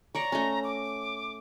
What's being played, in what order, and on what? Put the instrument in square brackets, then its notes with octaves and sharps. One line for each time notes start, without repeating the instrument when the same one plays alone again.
[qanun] C#5 D5 C#6 [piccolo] A#5
[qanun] A3 C#4
[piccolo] D6